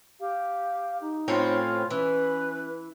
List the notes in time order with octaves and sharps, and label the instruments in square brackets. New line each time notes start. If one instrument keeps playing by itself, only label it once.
[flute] G4 [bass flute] F5
[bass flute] D#4
[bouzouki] A2 C4 C#4 [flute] F4
[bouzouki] E3 [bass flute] C#4 [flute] B4